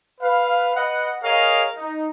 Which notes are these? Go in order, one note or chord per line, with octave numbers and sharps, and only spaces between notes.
B4 F5
B4 D#5 F#5
G#4 A#4 C#5 D#5 F5
D#4